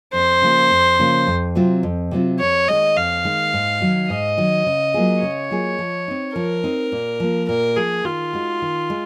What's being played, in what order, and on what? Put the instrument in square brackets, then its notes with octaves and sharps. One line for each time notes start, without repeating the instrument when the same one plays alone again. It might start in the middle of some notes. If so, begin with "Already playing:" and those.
[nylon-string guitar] F2 [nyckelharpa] C5
[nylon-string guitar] C#3 F3 A#3
F2
C#3 F3 A#3
F2
C3 F#3 C4 F4
F2
C3 F#3 C4 F4
[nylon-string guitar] F2 [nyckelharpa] C#5
[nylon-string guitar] D#3 G#3 [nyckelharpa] D#5
[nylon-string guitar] F2 [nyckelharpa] F5
[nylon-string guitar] D#3 G#3
G#2
D#3 F#3
[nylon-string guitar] G#2 [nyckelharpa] D#5
[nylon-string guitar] D#3 F#3
C#3
F#3 A#3 F4 G#4
[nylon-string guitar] C#3 [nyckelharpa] C#5
[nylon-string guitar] F#3 A#3 F4 G#4
F3
C4 D#4
[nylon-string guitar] F3 [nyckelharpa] A#4
[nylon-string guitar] C4 D#4
A#2
F3 A#3
[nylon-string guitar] A#2 [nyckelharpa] A#4
[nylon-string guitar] F3 A#3 [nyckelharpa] G#4
[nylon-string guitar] D#3 [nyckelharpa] F4
[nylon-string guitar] G#3 D#4 F#4
D#3
G#3